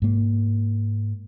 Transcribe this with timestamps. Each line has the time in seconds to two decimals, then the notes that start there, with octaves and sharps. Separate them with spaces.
0.02 G#2 A#3